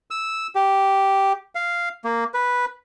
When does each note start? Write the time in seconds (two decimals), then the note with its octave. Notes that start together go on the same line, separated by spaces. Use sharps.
0.11 E6
0.55 G4
1.55 F5
2.04 A#3
2.34 B4